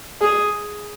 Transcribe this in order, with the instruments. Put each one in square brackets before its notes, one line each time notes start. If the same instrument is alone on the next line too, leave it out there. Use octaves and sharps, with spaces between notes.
[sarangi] G#4